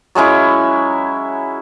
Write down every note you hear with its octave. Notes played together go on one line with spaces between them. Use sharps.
F#3 G#3 C#4 E4